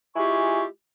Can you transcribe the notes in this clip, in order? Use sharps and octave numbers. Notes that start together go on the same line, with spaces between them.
G#3 E4 F4 G4 G#5 C#6